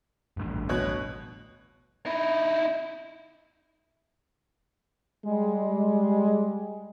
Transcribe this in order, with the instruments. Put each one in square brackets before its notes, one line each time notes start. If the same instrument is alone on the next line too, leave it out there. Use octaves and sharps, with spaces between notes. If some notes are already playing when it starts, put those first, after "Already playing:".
[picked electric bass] A1 D2 G2
[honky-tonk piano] B2 C#5 F#6
[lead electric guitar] D#4 E4
[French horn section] G3 G#3